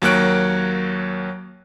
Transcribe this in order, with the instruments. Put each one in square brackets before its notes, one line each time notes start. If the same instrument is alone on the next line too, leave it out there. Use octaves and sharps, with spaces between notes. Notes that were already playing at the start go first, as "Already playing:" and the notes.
[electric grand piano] D#2 F#3 A#3 C#5 F#6 D7